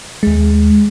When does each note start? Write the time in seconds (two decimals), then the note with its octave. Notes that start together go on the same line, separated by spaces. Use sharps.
0.23 D#2 G#3